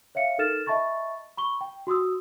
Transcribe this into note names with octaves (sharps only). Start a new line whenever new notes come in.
C#5 E5 F5 C#7
D#4 A4 A#4 F6 A6 E7
D#5 E5 A5 B5 C#6 A6
B5 C#6 G7
G5
F#4 C6 D#6 E6